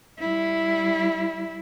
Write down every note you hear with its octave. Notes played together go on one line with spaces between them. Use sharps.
G3 E4